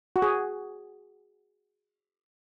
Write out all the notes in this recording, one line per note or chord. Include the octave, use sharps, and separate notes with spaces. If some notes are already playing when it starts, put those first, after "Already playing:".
F#4
G#4